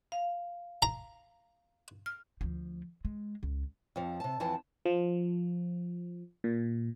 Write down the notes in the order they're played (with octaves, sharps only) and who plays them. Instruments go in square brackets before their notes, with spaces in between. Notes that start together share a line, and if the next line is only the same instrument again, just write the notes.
[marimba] F5
[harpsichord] A#5
[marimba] F6
[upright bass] D2 F3
G#3
C#2
[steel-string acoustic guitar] F2 F3
C3 A5
F2 E3 F3 A5
[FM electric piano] F3
A#2